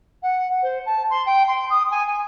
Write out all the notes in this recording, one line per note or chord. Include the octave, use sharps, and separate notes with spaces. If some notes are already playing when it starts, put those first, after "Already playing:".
F#5
C5
A5
C6
G5
C6
D#6
G#5
G#5